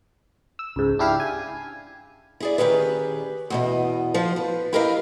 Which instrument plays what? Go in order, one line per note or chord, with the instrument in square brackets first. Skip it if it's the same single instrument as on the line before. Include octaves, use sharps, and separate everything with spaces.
[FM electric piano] E6
C#2 G#2
D4 E4 G4 F5
G#5
[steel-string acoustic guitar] E4 G#4 D5
D#3 A#3 C#4 G4 G#4 B4
E2 B2 D#5
F3 C5
B4
E4 G4 A#4 B4 D#5 F5